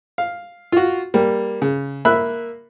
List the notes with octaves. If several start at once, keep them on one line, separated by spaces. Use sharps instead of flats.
F5
F4 F#4
G3 A#3
C#3
A#3 E5 B5 F#6